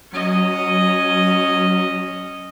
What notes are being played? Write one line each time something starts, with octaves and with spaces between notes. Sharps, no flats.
F#3 C#4 D#5